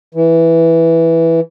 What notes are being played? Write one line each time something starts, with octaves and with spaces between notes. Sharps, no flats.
E3